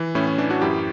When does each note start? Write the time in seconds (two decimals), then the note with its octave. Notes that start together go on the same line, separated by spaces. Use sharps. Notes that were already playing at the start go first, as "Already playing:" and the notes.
Already playing: E3
0.15 A2 C#4 E4
0.27 C#4
0.38 E3 D4
0.50 D4 F#4
0.62 F#2 E4 G4